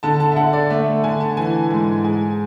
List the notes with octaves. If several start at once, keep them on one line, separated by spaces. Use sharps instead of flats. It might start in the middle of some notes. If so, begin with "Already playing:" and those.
D3 A5
A5
E5
D3 F#5
D5
A3 E5
D3 G#5
A5
E3 G#5
G#2 G#5
G#3 G#5